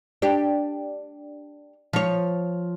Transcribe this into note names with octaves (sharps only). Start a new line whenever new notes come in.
D4 G4
F3 C#5